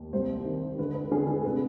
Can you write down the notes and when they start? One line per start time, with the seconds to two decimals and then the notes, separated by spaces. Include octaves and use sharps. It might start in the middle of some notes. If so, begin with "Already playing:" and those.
Already playing: D#2
0.13 C2 C5
0.45 D#3
0.78 D3 B4
0.94 B4
1.11 D3 G#4
1.27 G#4
1.44 C3 B4